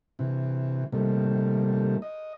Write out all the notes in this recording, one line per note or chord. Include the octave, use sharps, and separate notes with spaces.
C3 E3
C3 D#3 G3 A3 A#3
D#5